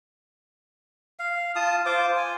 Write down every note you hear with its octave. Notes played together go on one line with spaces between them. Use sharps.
F5
F4 A5 D#6
F4 C5 D6
G#5